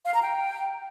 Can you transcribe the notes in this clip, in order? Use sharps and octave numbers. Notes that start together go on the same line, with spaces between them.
F5
A#5
G5